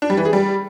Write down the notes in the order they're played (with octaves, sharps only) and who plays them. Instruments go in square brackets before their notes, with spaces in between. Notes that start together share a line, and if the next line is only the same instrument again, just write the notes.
[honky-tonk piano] D4
G3
E3
G#4
G3